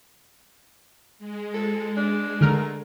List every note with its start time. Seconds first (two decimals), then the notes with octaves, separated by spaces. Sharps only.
1.19 G#3
1.54 A4
1.97 D4
2.41 D3 A3 A#4